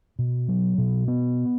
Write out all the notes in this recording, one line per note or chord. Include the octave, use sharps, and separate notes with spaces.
B2
F#3
B2
B3